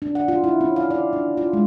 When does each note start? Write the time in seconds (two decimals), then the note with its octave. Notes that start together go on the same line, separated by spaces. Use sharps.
0.02 D4
0.15 F#5
0.28 F4
0.44 E4
0.61 C#4
0.76 F5
0.90 D5
1.13 D4
1.37 F4
1.53 G#3